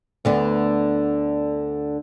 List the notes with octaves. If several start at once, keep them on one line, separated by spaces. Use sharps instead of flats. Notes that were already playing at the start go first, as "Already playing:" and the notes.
D2 D3 B3